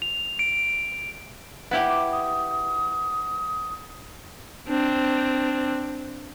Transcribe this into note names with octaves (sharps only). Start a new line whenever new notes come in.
F7
D7
B3 E4 G4
D6
D#6
C4 D4